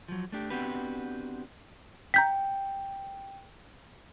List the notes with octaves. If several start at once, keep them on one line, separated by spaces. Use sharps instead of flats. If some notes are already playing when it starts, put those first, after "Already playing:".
F3 F#3
A3 D4 G4
B3 C4 D4 F#4 G4 B4
G5 A#5 G6 B6